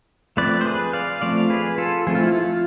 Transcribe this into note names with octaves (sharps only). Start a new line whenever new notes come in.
F3 A3 C4 B4 D5
C5
G#4 B4
D5 F5
F3 A3 C4 D5 F5
G#4 B4
F4 A4
F3 A3 C4 G#4
F4
E4
F4